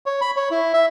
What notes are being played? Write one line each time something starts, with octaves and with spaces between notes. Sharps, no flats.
C#5
B5
C#5
E4
E5